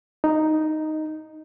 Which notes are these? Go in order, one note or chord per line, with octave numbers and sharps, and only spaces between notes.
D#4